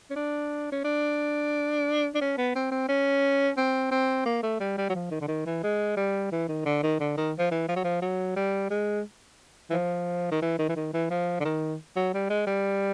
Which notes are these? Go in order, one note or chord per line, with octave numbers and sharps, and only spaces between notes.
C#4
D4
C#4
D4
D4
C#4
B3
C4
C4
C#4
C4
C4
A#3
A3
G3
G3
F#3
F3
D#3
D3
D#3
E3
G#3
G3
E3
D#3
D3
D#3
D3
D#3
F3
E3
F3
F#3
F3
F#3
G3
G#3
E3
F3
D#3
E3
D#3
E3
D#3
E3
F3
D3
D#3
F#3
G3
G#3
G3